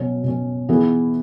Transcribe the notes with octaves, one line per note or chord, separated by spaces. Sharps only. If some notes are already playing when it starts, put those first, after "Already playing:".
Already playing: B2 F#3 C#4
B2 F#3 C#4
E3 B3 E4 G#4